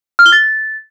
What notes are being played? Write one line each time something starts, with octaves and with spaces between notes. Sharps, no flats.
F6
G7
A6